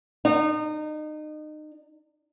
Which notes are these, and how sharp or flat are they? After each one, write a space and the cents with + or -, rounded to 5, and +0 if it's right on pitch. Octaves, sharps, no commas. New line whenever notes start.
D#4 -30